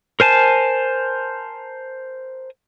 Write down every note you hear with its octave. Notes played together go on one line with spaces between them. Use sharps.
A#4 C5 G#5 A5